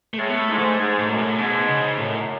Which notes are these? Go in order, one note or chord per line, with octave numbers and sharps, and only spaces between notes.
A3
A2 G#3
B3
A3
G#2
A3
G#2 G#3
A2
F#2
A2
G#2 B2
C#3
F#2 A2